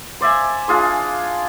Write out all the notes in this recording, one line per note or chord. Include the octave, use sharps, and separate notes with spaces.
C5 D5 E5 G#5
D4 F4 G#4 C6